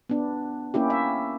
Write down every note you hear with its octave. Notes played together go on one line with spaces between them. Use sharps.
B3 D4
A#3 C#4 E4 G4
E5